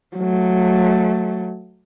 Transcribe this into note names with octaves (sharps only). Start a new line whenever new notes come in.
F#3 A3